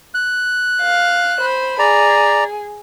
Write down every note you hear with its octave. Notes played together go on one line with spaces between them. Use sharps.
F#6
F5
C5 B5
G#4 D5 A#5